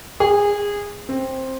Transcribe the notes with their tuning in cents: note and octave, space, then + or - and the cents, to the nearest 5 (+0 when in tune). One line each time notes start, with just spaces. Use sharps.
G#4 -20
C4 +10